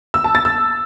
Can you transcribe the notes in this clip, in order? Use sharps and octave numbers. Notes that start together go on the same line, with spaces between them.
E6
A5
A6
E6